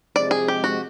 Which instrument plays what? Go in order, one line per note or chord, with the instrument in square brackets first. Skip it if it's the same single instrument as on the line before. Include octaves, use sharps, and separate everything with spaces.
[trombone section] C3 F3 G#3 [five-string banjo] D5
[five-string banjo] G#4
G4
F#4